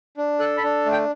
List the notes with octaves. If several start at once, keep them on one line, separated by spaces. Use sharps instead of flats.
D4
A4 F#6
B5
D4
A3
G5